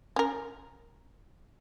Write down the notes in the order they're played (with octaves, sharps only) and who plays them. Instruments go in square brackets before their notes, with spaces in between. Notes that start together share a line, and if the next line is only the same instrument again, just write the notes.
[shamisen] C#4 A#4